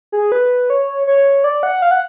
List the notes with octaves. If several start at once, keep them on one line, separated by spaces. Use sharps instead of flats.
G#4
B4
C#5
C#5
D5
F#5
F5
F#5